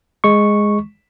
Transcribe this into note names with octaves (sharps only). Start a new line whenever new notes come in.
G#3 C#6